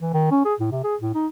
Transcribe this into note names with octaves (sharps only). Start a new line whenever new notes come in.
E3
D#3
C#4
G#4
A2
C3
G#4
A2
D#4